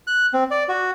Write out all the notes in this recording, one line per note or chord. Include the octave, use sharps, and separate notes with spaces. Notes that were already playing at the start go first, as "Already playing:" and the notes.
F#6
C4
D5
F#4